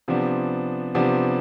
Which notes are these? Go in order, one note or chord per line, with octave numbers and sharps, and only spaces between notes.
C3 F3 B3 D4
C3 F3 B3 D4